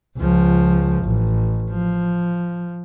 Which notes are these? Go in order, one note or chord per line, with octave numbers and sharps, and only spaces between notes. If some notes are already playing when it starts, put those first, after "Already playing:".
C#2 F3
A1
F3